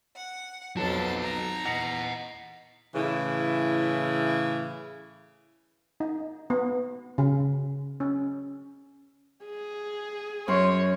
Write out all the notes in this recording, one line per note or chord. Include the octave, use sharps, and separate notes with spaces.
F#5
B1 F2 F#3 D#4 A4 A5 A6
A#5
E2 D#5 F#5 A#6 C#7 F7
A2 C#3 E3 E4
D#4
B3
C#3
C#4
G#4
F#2 C#5 C6